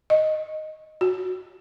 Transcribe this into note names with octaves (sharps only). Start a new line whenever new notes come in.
D#5
F#4